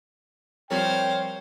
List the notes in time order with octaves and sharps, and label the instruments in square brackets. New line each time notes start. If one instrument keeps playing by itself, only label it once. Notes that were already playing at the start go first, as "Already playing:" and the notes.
[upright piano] F3 G3 C4 [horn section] A#4 G5 [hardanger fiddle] C5 F5 [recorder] C#5